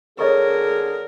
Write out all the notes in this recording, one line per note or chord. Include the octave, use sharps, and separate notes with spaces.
D3 G#4 A#4 C#5 D#5 C#6